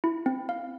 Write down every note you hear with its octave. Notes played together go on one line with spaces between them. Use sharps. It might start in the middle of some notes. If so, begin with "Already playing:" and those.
E4
C4
F5